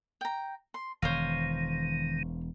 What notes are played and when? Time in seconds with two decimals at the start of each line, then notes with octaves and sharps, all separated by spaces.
0.21 G5 A#5
0.74 C6
1.02 E1 D#3 C5 C#5 F5